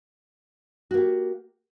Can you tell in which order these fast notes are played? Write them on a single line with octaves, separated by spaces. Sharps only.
F#4 A#3 G4